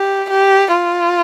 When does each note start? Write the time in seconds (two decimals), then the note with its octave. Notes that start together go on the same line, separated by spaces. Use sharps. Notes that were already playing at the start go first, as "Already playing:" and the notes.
Already playing: G4
0.30 G4
0.72 F4